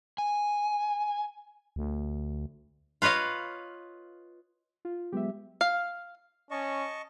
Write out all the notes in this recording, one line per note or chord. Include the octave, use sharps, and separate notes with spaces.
G#5
D2
F4 B4 C#5 D#5 F5
F4
F#3 G#3 B3 G4 E5
F5
C#4 D#5 A5 C#6